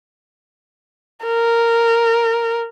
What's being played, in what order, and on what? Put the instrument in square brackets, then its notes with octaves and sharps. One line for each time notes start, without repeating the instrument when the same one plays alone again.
[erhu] A#4